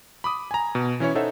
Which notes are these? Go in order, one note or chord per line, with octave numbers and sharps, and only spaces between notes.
B5 D6 D#6
G#5 A#5
B2
E3 C#4 E4 C#5
D#4 A4 C5 C#5 E5 F#5